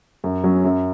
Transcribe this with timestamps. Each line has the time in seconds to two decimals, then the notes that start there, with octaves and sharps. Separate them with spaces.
0.24 F#2
0.44 F#3 C#4
0.64 F#2